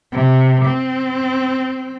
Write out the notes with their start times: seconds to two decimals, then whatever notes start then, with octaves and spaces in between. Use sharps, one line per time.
0.12 C3
0.65 C4